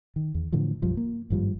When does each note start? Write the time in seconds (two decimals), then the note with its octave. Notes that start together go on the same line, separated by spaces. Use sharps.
0.16 D#3
0.35 E2
0.52 A2 D3 E3 F3
0.82 B1 F#2 F3 G3
0.97 A#3
1.30 G#1 G2 F3 G3